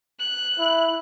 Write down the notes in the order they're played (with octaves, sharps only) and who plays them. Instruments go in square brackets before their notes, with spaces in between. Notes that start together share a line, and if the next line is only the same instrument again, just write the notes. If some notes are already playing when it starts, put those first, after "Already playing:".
[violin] F#6
[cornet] E4